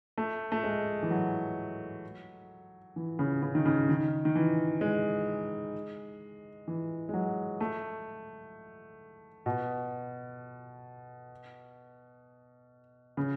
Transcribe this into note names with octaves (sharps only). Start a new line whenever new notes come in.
A3
A3
G#3
E3
F#3
E3
C#3
C#3
D#3
C#3
D#3
D#3
E3
G#3
E3
G#3
F#3
A3
B2
C#3